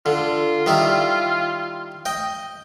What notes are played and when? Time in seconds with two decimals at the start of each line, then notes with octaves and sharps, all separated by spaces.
0.06 D3 F4
0.66 D#3 G3 E4
2.06 D#5 G5